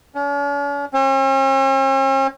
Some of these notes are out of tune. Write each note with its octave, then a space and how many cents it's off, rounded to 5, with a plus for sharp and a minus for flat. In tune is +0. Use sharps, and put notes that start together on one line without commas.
C#4 +45
C#4 -45